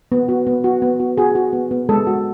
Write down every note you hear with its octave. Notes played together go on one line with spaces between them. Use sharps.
B3
F#4
B3
F#4
B3
F#4
F#4 G#4
F#4
B3
B3
G#3 A4
F#4